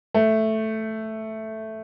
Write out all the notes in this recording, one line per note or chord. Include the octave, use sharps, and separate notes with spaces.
A3